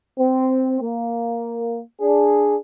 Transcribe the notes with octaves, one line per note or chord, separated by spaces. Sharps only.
C4
A#3
D4 G#4